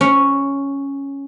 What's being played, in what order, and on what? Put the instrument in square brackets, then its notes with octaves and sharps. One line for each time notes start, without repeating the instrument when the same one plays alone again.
[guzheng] C#4